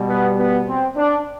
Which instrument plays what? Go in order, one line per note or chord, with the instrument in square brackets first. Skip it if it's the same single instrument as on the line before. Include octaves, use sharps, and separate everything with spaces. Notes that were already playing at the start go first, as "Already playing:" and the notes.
Already playing: [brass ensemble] B2 G3
B3
B3
C4
D4